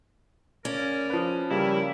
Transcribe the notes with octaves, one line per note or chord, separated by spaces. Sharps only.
C#3 C#4 A#4 D5
F3 B4
C#3 G3 A#3 E4